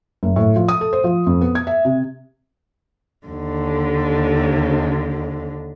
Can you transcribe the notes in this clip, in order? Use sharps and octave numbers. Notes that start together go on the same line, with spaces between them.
F#1
A2
F3
D#6
A4
C5
F3
F2
B3
G#6
E5
C3
D#2 D3